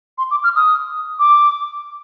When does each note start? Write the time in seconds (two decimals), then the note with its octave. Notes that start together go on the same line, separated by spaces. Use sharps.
0.18 C6
0.31 D6
0.44 F6
0.56 D#6
1.19 D6